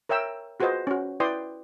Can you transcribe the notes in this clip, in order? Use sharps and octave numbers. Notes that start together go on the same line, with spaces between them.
A#4 C#5 E5 G5 E6
F4 F#4 G#4 B4 C5 D#5
C#4 F#4
E4 B4 D5 G5 C6 D#6